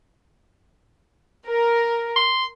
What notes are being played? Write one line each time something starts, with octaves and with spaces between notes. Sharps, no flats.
A#4
C6